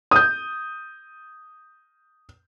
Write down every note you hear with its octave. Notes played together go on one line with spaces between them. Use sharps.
D#6 G6